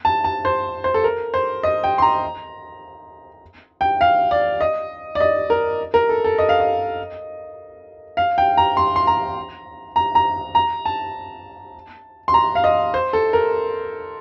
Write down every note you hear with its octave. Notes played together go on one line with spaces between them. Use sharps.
A5
A5
C5
C5
A4
A#4
C5
D#5
G5
C6
A#5
G5
F5
D5
D#5
D5
D#5
A#4
A#4
A4
A4
D#5
F5
D#5
F5
G5
A#5
C6
C6
A#5
A#5
A#5
A#5
A5
C6
A#5
F5
D#5
C5
A4
A#4